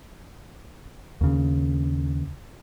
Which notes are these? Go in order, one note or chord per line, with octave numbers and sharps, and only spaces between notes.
D#2 C#3